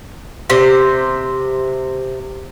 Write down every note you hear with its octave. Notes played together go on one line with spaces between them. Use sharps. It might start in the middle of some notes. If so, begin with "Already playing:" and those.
C3 C5